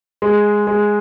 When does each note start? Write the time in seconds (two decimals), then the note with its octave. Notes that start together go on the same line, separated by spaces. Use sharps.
0.22 G#3
0.67 G#3